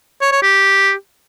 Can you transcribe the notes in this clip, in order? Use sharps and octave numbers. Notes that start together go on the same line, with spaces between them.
C#5
C#5
G4